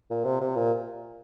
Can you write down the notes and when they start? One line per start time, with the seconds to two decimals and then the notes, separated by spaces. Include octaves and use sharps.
0.10 A#2
0.25 C3
0.41 C3
0.56 A#2